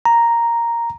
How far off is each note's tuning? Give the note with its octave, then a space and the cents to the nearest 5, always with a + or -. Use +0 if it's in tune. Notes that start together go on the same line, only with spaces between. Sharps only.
A#5 +0